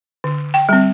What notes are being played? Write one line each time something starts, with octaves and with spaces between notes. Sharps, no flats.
D3
G5
G3 C4